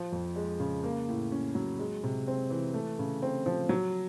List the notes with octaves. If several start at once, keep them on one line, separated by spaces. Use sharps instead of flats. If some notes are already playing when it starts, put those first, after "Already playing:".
Already playing: F3
F2
G#3
C#3
A#3
A2
C#4
F#3
G#3
C3
C4
E3
A3
C#3
C4
F3
F#3